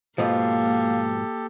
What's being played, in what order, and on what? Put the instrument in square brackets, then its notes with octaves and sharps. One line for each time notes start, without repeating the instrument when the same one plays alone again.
[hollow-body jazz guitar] G#2 B2 F3 [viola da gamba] A#3 [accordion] G4 A4 [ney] F5